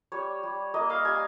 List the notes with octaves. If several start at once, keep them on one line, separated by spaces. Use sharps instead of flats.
G3 C#5
G3
A#3 D#5
F5
G3 G#5